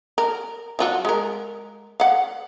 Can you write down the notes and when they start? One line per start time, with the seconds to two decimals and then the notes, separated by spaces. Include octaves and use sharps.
0.18 A#4
0.79 F#3 F4 F#4
1.05 G#3 A#4
2.00 F5 F#5